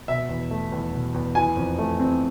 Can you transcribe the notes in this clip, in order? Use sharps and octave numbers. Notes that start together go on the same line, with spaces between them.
B2 E5
E2
A3
E2
B2
E2
E3 G#5
F2
A3
C4